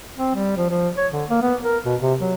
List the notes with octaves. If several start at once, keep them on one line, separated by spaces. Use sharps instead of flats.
C4
G3
F3
F3
C#5
D3
A#3
B3
A#4
B2
C3
F#3